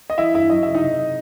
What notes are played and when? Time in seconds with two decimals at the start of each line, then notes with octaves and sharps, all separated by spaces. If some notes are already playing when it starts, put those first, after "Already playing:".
0.10 D#5
0.18 E3 E4 E5
0.34 G2 E4 E5
0.50 F#3 D#5
0.63 C#3 E5
0.75 D#4 D#5
0.82 C3